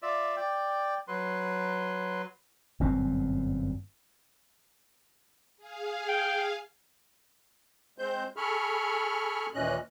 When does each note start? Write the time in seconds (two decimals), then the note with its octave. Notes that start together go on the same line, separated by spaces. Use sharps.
0.02 F4 D5 E5
0.37 D5 G5
1.08 F#3 B4 C6
2.80 G1 F#2 A#2 C4
5.57 G#4 F5
6.09 G5
7.98 G#3 C4 C5 G6
8.37 G#4 A4 B5 C#6 F6
9.54 D#2 A#2 E3 C#4 D#5 F#6